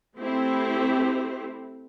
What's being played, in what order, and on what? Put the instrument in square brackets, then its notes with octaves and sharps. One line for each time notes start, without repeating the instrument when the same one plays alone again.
[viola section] A3 C4 E4 G4 C5